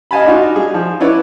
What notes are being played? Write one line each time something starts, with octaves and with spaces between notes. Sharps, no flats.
D#5 F5 G#5 A5 B5
D4 D#4 F4 F#4
G3 G#4
F3
D4 E4 B4 C#5 D5 E5